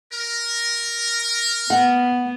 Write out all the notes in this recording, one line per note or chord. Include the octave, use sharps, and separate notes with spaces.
A#4
B3 F#5